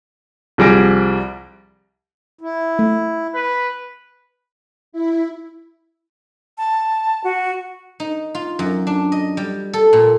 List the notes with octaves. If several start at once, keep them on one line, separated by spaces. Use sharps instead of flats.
C2 F3 G3 G#4 A#6 D7
E4
A3
B4
E4
A5
F#4
D#4
F4
F#2
D4
D#5
G3
A4
A#2